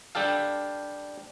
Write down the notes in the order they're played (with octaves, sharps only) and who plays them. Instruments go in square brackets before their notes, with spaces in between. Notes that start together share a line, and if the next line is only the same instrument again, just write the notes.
[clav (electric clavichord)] G3 D4 G4 A4 F5